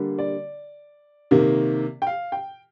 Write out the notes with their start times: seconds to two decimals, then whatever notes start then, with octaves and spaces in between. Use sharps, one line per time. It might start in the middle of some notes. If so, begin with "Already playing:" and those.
Already playing: D3 G3 A#3
0.18 D5
1.31 C3 D#3 A#3
2.02 G5
2.07 F5
2.32 G5